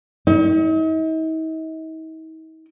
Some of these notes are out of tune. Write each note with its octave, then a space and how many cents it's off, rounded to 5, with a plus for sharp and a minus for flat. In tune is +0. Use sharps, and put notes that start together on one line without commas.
D#4 +45